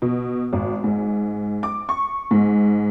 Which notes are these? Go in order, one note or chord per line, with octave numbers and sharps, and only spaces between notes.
B2
G#1
G#2
D6
C#6
G#2